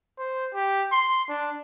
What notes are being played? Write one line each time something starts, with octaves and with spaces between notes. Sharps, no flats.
C5
G4
C6
D4